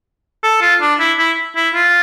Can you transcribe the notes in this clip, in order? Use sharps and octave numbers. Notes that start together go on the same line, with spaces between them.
A4
F4
D4
E4
E4
E4
F4